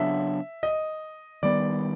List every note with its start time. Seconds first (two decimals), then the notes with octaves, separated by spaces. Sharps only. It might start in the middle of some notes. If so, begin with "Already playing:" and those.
Already playing: C#3 F#3 B3 D4 E5
0.63 D#5
1.43 D#3 G3 B3 D5